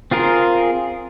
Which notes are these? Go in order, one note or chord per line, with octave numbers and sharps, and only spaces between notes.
C4 F4 G#4 A#4